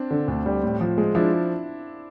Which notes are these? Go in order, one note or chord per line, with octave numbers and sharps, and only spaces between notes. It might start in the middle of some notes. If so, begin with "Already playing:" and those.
Already playing: C4 D4
D3
D2
G3
A2
F3
G#3
F3 D4 E4